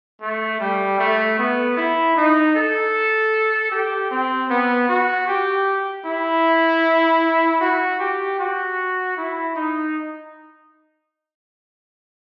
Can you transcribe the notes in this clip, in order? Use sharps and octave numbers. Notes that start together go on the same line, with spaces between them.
A3
G3
A3
B3
E4
D#4
A4
G4
C4
B3
F#4
G4
E4
F#4
G4
F#4
E4
D#4